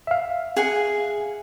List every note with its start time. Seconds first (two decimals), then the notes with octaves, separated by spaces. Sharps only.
0.07 E5 F5
0.56 G#4 F#5 G#5